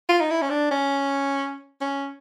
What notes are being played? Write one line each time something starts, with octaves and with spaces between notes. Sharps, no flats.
F4
D#4
E4
C#4
D4
C#4
C#4